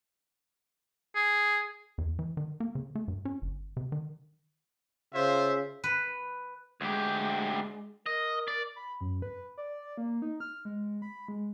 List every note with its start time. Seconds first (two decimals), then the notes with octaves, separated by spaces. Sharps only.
1.15 G#4
1.98 E2
2.19 E3
2.37 D#3
2.60 A#3
2.75 C#3
2.95 A3
3.08 G2
3.25 C#4
3.42 G1
3.77 C3
3.92 D#3
5.14 C#3 F4 C5 E5
5.84 B4
6.81 D2 G#3 G4
8.06 A#4 D#5
8.48 D5
8.76 B5
9.01 F#2
9.22 B4
9.58 D5
9.98 A#3
10.22 D#4
10.40 F6
10.65 G#3
11.02 B5
11.28 G#3